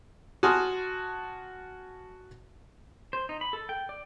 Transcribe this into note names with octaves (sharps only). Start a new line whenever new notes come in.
F#4 G#5 A5 C6 D#6 F6
C5
D#4
B5
A4
G5
D5